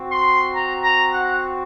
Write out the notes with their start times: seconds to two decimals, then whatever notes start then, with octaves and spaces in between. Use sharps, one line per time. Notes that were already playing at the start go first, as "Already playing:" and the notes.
Already playing: C4 F#4
0.08 C6
0.51 A#5
0.81 A#5
1.10 F#5